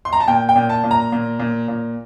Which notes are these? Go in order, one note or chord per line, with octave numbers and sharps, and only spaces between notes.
C6
A#5
A5
A#2 G5
G5
A#2
A5
A#2
A#5
A#2
A#2
A#2